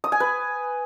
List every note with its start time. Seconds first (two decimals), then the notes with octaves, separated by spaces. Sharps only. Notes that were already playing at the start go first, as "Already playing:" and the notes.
0.04 D#6
0.12 G#5
0.20 B4